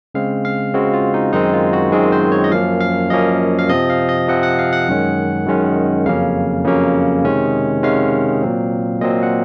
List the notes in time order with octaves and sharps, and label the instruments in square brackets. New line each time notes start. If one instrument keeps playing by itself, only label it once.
[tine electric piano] C#3 G#3 C4 F5
F5
C#3 G#3 C4 F#4
F4
D#4
F#2 D#3 G#3 C4 D#4
F4
F#4
F#2 D#3 G#3 C4 G#4
C5
C#5
D#5
F#2 F3 A#3 C#4 F5
F5
F#2 F3 A#3 C#4 D#5
F5
C3 F3 C4 D#5
F5
D#5
C3 F3 C4 F#5
F#5
F5
F#5
F#2 D#3 G#3 C#4
F#2 D#3 G#3 C#4
F2 C#3 F#3 A#3 C#4 F5
F2 C#3 F#3 A#3 C#4
C3 D#3 G#3 C#4
C3 D#3 G#3 C#4 F5
A#2 F#3 C4
A#2 F#3 C4 D#5
F#5